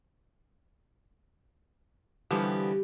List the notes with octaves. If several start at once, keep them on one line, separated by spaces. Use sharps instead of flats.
D3 E3 F3 G3 B3 G4